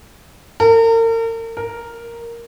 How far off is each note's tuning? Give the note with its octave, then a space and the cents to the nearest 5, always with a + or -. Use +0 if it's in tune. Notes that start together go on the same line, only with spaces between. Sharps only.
A#4 -40
A#4 +0